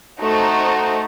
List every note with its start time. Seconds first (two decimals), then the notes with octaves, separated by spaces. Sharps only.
0.20 A3 D#4 F#4 C5